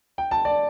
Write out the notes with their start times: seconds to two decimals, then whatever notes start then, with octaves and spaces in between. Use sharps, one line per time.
0.18 G5
0.31 A5
0.45 D5